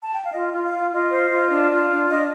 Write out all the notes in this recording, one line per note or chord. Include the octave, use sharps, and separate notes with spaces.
A5
G5
F5
F4 D#5
F4
F5
F4
F4 D#5
C5
F4
D4
F4
D4
D4 D#5